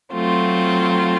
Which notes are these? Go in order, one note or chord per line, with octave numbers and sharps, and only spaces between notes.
F#3 A3 C4 F4